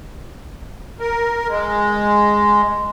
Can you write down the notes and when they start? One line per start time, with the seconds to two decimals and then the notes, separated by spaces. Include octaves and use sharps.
1.00 A#4
1.49 G#3